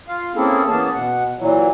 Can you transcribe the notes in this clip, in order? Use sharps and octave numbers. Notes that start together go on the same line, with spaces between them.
F4 F5
A#3 C4 C#4 E4 G#4 A4
E3 A#3 B3 C#4 G#4 A5
B2 F#5
A#2 E3 F#3